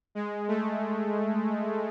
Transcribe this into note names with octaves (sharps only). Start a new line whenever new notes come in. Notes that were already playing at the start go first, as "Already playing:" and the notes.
G#3
A3